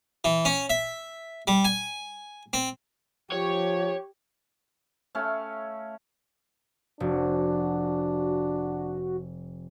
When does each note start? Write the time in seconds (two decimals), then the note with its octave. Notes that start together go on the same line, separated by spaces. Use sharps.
0.24 E3
0.45 C#4
0.70 E5
1.47 G3
1.65 G#5
2.53 C4
3.32 F3 G4 C#5
5.15 A3 C#4 F5 G5
7.00 F1 D4 F#4